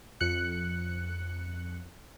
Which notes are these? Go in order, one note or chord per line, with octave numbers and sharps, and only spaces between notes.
F2 F#6 C#7